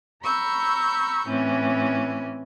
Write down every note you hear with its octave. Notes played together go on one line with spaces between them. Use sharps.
A#5 B5 C#6 E6 G6
A2 E3 C4 C#4